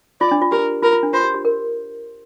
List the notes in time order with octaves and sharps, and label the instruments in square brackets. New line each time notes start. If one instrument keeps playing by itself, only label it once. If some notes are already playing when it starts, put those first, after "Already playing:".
[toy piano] F4 [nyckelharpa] D5
[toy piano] D4
F4
[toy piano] G4 [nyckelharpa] A#4
[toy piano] F4 [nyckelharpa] A#4
[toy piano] F4
D4
[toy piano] F4 [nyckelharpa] C5
[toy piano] G4
G4
A#4